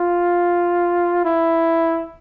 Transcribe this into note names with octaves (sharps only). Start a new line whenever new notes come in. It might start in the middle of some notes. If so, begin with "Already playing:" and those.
Already playing: F4
E4